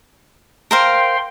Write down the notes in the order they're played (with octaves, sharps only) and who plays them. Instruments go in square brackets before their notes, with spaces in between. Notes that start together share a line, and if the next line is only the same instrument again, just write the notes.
[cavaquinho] A#4 C5 F5 [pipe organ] G5 C6